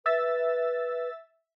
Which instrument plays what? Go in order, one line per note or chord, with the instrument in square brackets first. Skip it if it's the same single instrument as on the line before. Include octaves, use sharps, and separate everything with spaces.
[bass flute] B4 [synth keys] E5 E6 A6